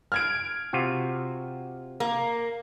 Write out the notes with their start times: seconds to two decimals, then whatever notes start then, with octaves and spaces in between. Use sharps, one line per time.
0.12 F6 G#6 D7
0.73 C3 F4 F#4
2.00 A#3